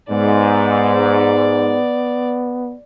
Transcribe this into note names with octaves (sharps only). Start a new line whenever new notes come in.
G#2 B3 D5